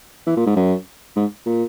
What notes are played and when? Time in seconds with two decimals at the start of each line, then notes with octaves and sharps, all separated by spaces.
0.27 E3
0.37 A#2
0.46 G#2
0.56 F#2
1.16 G#2
1.46 A#2